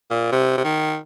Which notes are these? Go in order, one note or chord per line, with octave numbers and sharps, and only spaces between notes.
A#2
C3
C3
D#3